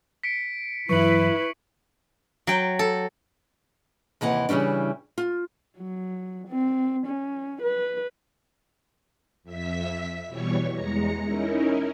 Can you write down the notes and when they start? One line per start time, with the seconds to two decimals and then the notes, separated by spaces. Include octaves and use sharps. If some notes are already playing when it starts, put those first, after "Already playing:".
0.23 B6 C#7 D7
0.89 G2 E3 F#3 E4 B4 C#6 C#7 F#7
2.47 F#3 G5
2.79 A4
4.21 D#2 C3 E3 F#5
4.49 C#3 E3 G3 C#4 D4
5.18 F4
5.78 F#3
6.48 C4
7.06 C#4
7.62 B4
9.43 F2 E5 B6
10.27 B2 E3 G3 C#5 C#6
10.72 E2 G#3 A#5 A#6 C#7
11.24 C#4 D#4 E4 A#4